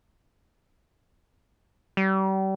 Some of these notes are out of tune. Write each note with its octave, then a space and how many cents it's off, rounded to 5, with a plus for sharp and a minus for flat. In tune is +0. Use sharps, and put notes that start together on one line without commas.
G3 -35